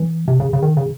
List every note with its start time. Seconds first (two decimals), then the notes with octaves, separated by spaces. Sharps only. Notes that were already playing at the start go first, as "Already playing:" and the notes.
Already playing: E3
0.28 C3
0.40 C#3
0.53 C#3
0.63 D#3
0.77 C#3